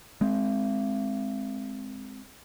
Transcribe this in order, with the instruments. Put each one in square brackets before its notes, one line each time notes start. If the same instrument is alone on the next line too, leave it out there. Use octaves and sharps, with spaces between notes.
[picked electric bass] G#3 C4